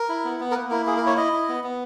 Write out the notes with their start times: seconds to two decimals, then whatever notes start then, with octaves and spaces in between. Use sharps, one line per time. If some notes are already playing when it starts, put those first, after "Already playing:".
Already playing: A#4
0.09 E4
0.25 B3
0.40 B3
0.51 A#4
0.55 A#3 B4
0.70 E4 A#4
0.86 A#3 G#4
0.97 A#4
1.02 E4 C#5
1.17 E4 D#5
1.32 E4
1.49 B3
1.64 B3